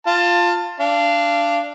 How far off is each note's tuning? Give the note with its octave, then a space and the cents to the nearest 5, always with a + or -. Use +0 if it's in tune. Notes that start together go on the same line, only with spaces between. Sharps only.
F4 +0 A5 +20
D4 -5 F5 -25